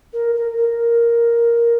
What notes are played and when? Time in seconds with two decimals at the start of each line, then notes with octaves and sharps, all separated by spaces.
0.13 A#4
0.35 A#4
0.58 A#4